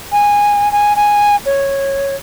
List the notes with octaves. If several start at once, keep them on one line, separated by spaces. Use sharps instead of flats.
G#5
G#5
G#5
C#5